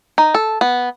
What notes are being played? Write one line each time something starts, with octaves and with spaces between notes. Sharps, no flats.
D#4
A4
B3